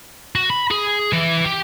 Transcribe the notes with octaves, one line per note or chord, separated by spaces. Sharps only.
F#4
B5
G#4
E3
G4